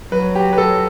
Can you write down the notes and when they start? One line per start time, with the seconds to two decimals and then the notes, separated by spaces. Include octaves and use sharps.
0.12 F#3 B4
0.35 G4
0.53 B4
0.58 A4